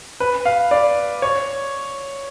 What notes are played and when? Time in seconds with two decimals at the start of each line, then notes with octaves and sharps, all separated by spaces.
0.20 B4
0.46 F5
0.71 D5
1.22 C#5